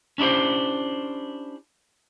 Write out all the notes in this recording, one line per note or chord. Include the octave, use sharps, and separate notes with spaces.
C#4 D4 E4 G4 C5